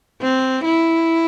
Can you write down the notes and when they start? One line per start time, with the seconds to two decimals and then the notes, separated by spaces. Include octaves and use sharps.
0.22 C4
0.65 E4